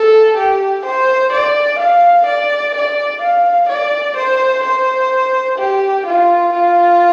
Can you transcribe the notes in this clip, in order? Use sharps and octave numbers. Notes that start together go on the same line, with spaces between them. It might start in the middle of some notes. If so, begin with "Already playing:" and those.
Already playing: A4
G4
C5
D5
F5
D5
D5
F5
D5
C5
C5
G4
F4
F4